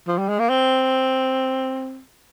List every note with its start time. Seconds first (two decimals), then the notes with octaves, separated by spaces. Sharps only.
0.08 F3
0.18 G3
0.29 G#3
0.39 A#3
0.50 C4